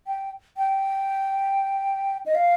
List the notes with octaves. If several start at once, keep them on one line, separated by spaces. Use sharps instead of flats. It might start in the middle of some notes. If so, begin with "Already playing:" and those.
G5
G5
D#5
F5